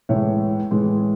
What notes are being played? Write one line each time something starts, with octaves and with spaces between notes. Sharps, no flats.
A2 E3 G#3 C#5 E5
A2 E3 G#3